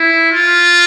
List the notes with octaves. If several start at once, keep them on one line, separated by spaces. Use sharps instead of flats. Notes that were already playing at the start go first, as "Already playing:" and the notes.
Already playing: E4
F4